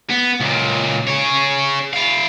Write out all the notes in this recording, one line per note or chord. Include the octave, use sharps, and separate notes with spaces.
B3
C#2 A#2
G#4 C#5
E4 F5